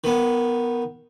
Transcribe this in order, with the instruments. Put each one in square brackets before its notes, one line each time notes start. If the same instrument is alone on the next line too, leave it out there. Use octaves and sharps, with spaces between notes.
[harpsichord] D#3 B3